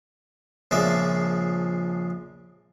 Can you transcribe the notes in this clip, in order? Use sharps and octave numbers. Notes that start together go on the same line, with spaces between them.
A#1 C#3 F3 G#3 D5 E5